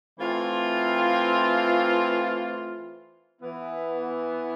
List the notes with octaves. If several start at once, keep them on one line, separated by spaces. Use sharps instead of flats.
E3 A3 C4 F4
E3 B3 E4